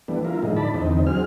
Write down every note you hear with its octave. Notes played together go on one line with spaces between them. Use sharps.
E3 G3 A3 B3 D4
E4 F4 A#4
A2 D3 F3 G#3 D#4
D5 A5 B5
E2 D3 C4 D#4
F#3 C4 G#4 F6